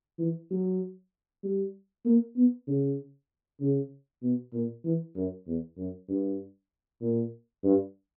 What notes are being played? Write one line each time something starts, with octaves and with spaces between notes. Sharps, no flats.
E3
F#3
G3
A#3
B3
C#3
C#3
B2
A#2
E3
F#2
E2
F#2
G2
A#2
G2